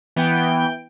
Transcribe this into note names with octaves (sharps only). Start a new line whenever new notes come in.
E3 B3 G5 G6 D7